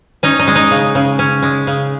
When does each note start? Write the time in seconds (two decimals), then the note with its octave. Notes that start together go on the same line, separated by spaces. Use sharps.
0.23 C#4 D#4
0.39 D#4
0.48 G#3
0.55 D#4
0.71 C#3
0.95 C#3
1.19 C#4
1.43 G#3
1.67 C#3